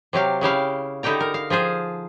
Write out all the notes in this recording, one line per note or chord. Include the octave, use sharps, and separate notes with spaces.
C3 F#3 G4 F5
C#3 E4 G4 F5
D3 D#4 E4 G4 G5 A#5
A#4
F5
F3 F4 G#4 C5